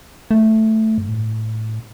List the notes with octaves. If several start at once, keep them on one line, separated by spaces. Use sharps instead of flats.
A3
G2
A2